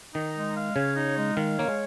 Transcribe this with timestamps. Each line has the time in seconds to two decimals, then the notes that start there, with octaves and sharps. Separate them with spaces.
0.15 D#3 D#4
0.36 G#3
0.56 F5
0.75 C#3 C#5
0.96 D#4
1.17 G#3
1.36 D#3 F5
1.58 A#3 C#5
1.68 G#3